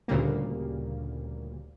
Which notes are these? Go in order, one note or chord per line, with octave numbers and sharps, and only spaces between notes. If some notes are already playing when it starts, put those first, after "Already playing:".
D2 A#2 C#3 G3 A#3